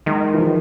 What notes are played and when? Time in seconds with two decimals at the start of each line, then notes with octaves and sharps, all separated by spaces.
0.06 D#3 G#3
0.34 E3
0.38 F3